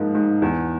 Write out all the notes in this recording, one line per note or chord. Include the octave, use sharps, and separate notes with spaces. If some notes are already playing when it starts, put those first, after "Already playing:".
Already playing: G#2 F3 A#3
G#2
E2